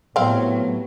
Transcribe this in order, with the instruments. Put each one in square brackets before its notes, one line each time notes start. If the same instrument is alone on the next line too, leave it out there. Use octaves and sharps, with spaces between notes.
[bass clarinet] A2 [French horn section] C3 A3 B3 [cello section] F#3 [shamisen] C4 F5